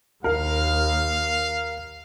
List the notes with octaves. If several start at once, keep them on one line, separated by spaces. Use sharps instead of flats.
D#2 A#4 F5